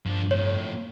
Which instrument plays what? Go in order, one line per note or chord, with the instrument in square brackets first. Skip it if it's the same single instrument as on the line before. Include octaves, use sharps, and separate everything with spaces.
[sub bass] G2 [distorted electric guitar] F3 D4
[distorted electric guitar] F2 A2 [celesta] C#5